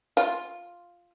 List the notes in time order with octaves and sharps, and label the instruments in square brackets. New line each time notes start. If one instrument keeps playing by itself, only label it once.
[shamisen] F4